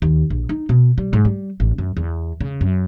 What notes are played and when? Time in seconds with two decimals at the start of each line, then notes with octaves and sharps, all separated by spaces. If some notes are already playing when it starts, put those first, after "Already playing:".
0.02 D#2
0.30 A#1
0.49 D#4
0.69 B2
0.98 G3
1.13 G#2
1.25 G3
1.60 A1
1.78 F#2
1.97 E2
2.41 C#3
2.61 F#2